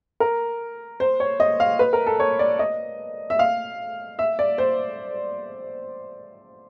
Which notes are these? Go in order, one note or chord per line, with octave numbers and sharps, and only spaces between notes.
A#4
C5
C#5
D#5
F5
B4
A#4
A4
C#5
D5
D#5
E5
F5
E5
D5
C5